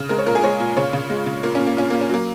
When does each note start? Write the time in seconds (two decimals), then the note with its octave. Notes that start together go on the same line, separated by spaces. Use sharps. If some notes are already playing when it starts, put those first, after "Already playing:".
Already playing: C#3
0.09 G#3 A#4
0.18 C#5
0.26 A#2 A#4
0.35 G#4
0.44 G#3 C#5
0.60 A#2
0.77 C#3 C#5
0.93 C#3
1.10 G#3
1.26 C#3
1.43 A#2 A#3
1.55 A#2 C#4
1.66 A#3
1.77 A#2 C#4
1.90 A#2 A#3
2.01 C#4
2.09 F#3 A#3